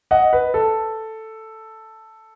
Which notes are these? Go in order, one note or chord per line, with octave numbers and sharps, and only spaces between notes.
D#5 F#5
B4
A4